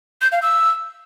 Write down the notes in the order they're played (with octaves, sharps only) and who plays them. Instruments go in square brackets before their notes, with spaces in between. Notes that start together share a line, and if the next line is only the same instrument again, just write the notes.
[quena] G6
F5
E6